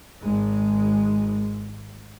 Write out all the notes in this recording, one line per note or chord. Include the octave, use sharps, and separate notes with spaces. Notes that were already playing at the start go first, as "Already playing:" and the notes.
G#1 G#3